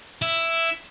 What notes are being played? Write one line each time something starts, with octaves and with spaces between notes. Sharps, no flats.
E4